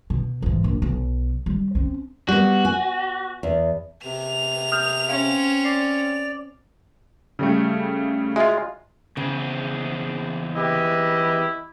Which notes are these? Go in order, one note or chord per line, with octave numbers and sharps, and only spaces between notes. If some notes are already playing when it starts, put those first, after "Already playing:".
B2
G#2 E3
A#1
B1
G3
C4 C#4
G3 B3 F#4
G#5
E2
C3 F7
D#6 F6 G6
C4 C#4 F5
D5 C7
C#3 G3 A3
G#3 F4 F#4 E5
E2 C#3 C4 G#4
E4 G4 B4 D#5